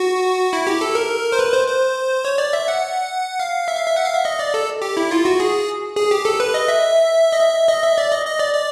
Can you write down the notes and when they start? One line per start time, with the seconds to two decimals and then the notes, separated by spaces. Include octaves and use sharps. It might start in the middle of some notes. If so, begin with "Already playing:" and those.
Already playing: F#4
0.53 E4
0.67 G4
0.81 A4
0.95 A#4
1.32 C5
1.39 B4
1.53 C5
1.67 C5
2.25 C#5
2.38 D5
2.53 E5
2.68 F#5
3.40 F5
3.68 E5
3.77 F5
3.87 E5
3.96 F#5
4.05 F5
4.15 E5
4.25 D#5
4.39 D5
4.54 A4
4.82 G4
4.97 E4
5.11 F4
5.25 F#4
5.40 G#4
5.96 G#4
6.11 G4
6.25 A4
6.40 B4
6.54 D#5
6.68 E5
7.32 D#5
7.40 E5
7.68 D#5
7.83 E5
7.98 D5
8.12 D#5
8.26 D#5
8.39 D5
8.54 D5